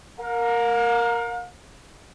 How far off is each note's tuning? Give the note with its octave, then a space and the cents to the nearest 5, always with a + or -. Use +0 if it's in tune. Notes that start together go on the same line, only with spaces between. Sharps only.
A#4 +0 F5 +40